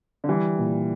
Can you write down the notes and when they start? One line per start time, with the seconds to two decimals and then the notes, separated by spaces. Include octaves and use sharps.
0.24 D3
0.29 E3 G3
0.59 A#2